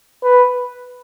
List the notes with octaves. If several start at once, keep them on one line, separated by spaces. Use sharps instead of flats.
B4